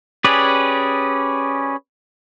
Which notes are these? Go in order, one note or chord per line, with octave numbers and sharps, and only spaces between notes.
C#4 G4 G#4 B4 D5